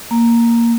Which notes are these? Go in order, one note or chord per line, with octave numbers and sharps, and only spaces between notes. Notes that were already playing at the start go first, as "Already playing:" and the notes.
A#3